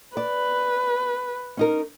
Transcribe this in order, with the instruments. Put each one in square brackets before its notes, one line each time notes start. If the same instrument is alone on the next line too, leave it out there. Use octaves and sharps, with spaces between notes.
[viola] B4 [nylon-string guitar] D5
[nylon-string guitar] C#4 D#4 A#4